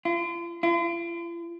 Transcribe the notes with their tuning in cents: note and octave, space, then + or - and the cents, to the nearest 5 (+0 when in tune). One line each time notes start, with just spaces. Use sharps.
F4 -40
F4 -45